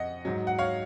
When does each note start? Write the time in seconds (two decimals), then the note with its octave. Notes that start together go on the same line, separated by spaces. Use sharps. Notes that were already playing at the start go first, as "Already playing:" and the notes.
Already playing: F2 D#5 F#5
0.25 G#2 F#3
0.47 F#5
0.59 C#5 F5